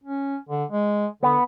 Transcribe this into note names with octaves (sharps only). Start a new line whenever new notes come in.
C#4
D3
G#3
D3 B3